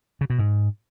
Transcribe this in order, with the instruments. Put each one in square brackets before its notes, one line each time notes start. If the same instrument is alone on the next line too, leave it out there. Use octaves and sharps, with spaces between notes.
[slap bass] C#3
B2
G#2